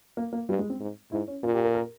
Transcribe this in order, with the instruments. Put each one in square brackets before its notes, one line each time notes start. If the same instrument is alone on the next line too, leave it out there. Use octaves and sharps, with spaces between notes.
[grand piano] A#3
A#3
[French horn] G2 [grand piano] G3
[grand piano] G#3
C4
[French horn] G#2
[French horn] G#2 [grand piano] E4
[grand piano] C#4
[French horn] A#2 [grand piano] F4
[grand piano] G4
A#4
A#4